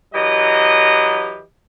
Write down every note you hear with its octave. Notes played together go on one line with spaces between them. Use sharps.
E3 F#3 G4 D#5